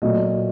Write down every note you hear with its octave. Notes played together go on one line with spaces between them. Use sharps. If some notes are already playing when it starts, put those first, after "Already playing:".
A#2 F#3 A3 D#5